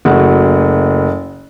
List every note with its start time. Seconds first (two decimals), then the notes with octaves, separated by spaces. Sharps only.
0.05 F#1 A3 F#4 F#5